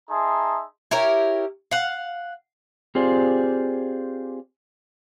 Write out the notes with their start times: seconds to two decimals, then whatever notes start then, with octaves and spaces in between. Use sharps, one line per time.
0.10 D#4 G#4 E5 A5 A#5 C6
0.91 E4 G4 A#4 C#5
1.71 F5 F#5
2.95 C4 F4 G4 G#4 C5 D5